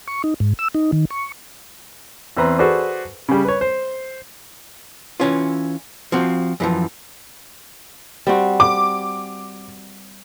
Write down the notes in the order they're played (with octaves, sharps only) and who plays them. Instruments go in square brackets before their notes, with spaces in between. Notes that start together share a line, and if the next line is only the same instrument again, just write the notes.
[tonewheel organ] C#6
D#4
G#2
E6
D#4
D#3
C#6
[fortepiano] E2 C4 B4 A#5
F#4 G#4 A4 B4 C5 D5
C#3 G3
B4 C#5
C5
[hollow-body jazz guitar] E3 C#4 F4
F3 C4 F#4
F#2 E3 F3
[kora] G3 C4 F#4
[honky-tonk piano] D6